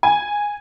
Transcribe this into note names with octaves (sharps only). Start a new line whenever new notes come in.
G#5